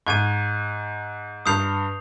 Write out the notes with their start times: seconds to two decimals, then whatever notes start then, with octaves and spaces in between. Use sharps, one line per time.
0.06 G#2 C#6 G#6 D#7
1.46 G2 D#6 G6 C7 F7